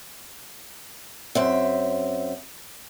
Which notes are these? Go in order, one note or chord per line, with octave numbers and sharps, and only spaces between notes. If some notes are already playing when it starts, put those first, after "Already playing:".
F#2 C4 E5